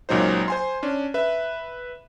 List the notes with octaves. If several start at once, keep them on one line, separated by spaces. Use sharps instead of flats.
C#2 A#2 F#3 D#4 C5
C5 G#5 C6
C#4 D4
B4 E5